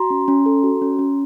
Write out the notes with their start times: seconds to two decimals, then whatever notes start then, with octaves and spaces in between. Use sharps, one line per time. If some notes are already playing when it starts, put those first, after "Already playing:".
Already playing: F#4 A#5 C6
0.10 C#4
0.28 C#4
0.46 A4
0.64 F#4
0.82 C#4
0.99 C#4